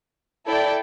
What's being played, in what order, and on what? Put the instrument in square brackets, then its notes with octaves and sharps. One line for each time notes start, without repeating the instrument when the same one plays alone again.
[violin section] E4 A4 D5 G5